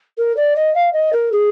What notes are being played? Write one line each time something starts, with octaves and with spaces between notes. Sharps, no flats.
A#4
D5
D#5
F5
D#5
A#4
G#4